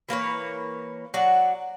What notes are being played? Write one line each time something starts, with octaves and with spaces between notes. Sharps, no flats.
E3 A#3 B4 C#5
F#3 F#4 D5 F#5